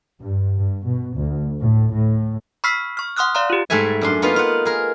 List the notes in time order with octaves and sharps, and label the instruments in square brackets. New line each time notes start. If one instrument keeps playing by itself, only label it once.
[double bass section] G2
G2
B2
D2
A2
A2
[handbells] B5 C#6 E6 F6 B6 C7
C#6 F6
F#5 C6 D#6 F6 F#6
D5 F5 A#5 C6
F4 G4
[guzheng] G#2 G3 A3 E5 G#5
F#2 D4 C6
A#3 B3 D#4 F4
F4 F#5
G#4 A#4